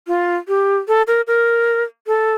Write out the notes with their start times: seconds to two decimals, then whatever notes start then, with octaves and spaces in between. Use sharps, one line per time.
0.08 F4
0.48 G4
0.88 A4
1.07 A#4
1.27 A#4
2.07 A4